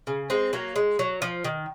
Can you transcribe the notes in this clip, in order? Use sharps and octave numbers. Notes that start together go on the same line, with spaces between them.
C#3
G#3 C4
F#3 A#3
G#3
F#3
F3
D#3